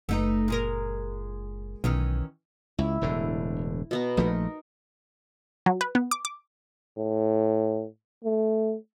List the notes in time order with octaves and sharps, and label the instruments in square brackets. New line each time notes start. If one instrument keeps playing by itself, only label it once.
[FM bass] F#1 [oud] A3 D#4 B4
[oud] A#2 G#3 A#4
[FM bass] B1 [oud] D#3 E3 C#4
[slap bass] C#2 [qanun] E4
[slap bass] E1 A2 D3
[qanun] B2 B3 A#5
[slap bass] A#1 F3 A3 [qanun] D#4 A#4
[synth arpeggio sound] F#3
B4
B3
D6
D6
[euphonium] A2
A3